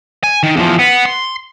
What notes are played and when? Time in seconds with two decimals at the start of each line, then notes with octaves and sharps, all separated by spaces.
0.23 G#5
0.43 D#3
0.57 E2 F3
0.79 B3
1.05 C6